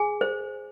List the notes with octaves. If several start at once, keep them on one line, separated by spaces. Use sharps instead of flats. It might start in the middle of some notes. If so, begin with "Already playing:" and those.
Already playing: G#4 G#5
C5